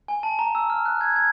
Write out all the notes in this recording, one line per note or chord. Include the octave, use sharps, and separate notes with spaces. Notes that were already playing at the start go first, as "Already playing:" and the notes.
G#5
A5
A#5
E6
F6
F#6
G#6
G#6